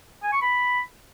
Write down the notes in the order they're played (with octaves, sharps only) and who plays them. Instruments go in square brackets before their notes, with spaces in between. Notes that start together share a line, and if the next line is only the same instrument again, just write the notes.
[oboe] G#5
C#6
B5